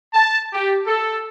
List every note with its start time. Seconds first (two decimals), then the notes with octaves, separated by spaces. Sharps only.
0.14 A5
0.54 G4
0.87 A4